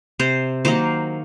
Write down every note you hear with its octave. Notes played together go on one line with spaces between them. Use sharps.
C3 C5
D#3 F#3 A#3 C5